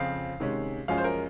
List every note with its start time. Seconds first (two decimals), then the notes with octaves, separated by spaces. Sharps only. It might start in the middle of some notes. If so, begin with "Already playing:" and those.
Already playing: F2 C#3 F3 C4 F5
0.40 C3 D#3 G#3 C#4
0.88 F#2 F3 G#3 C#4 F5
0.98 C5
1.04 A#4